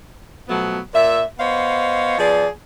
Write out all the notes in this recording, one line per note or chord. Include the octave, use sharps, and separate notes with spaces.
B2 F3 F#3 A3 B3
A#2 E5
B3 C5 C#5 D#5 F5
F3 B3 G#4 D5